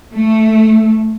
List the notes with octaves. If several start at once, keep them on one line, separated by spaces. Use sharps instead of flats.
A3